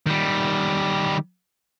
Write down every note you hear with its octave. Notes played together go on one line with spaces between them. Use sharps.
D#3 G3